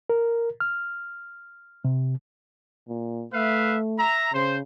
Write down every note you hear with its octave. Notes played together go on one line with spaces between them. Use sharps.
A#4
F6
C3
A#2
A3 B4 E5 F5
E5 A#5
C#3 C5